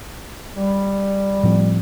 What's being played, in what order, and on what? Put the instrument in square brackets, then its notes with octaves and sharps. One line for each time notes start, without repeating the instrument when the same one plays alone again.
[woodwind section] G3
[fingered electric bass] A2 F3 C4